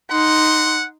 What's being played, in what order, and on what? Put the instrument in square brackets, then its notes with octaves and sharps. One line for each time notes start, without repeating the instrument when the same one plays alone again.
[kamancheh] D#4 C6 [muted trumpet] F#5